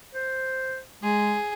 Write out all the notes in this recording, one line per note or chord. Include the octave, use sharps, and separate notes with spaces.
C5
G#3 G#4